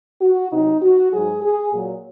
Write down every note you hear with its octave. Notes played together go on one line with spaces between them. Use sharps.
F#4
C3 F#3 D#4
F#4
G#2 F#3 G#4
G#4
A#2 F#3